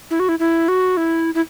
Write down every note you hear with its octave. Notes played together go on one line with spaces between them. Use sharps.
E4
F#4
E4
E4
F#4
E4
E4